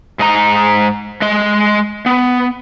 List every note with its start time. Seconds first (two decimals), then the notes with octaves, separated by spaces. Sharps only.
0.19 G#2 D#5 A#5
1.22 G#3 D#5
2.06 B3